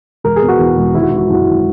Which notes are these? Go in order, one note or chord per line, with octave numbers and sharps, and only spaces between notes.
E1 A#4
G#4
B2
F#4
E2
E1
G#1 E4
F#4
E3 E4
F#4
E4
F#2 F#4
G#1 E4